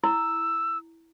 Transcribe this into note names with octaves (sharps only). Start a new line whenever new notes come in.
E4 E6